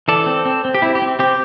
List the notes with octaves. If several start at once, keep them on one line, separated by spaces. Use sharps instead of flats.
E3 A4 D5
C4
C4
C4
G4
C4 E4
G4
C4
C4 G4